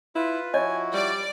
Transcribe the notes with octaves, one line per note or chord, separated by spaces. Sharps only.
E4 F4 B4
F3 E4 F#4 C#5 D#5 G#5
G3 D5